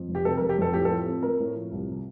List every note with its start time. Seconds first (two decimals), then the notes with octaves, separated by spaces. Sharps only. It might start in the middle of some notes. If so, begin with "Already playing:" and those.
Already playing: F2
0.08 F1
0.15 G4
0.25 C3 A4
0.37 A#4
0.41 F1
0.49 G4
0.58 F2 A4
0.73 A2 G4
0.85 A4
0.90 F3
1.06 C4
1.23 A3 A#4
1.39 A2
1.55 F3
1.72 C2
1.88 C3